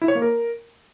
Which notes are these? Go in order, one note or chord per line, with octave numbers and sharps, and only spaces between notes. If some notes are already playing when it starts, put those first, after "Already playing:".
E4
C#5
A#3
A#4